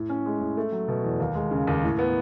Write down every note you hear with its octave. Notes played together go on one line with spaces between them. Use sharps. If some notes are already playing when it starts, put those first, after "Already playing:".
Already playing: A2
C#4
G#3
A2
A3
F#3
B2
E2
D#2
G#3
C#3
D#2
A2
B3